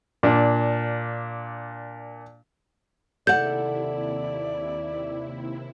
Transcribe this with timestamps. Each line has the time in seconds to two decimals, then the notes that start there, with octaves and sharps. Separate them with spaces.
0.23 A#2 D4
3.27 D#2 C3 E4 A4 D5 F#5 G6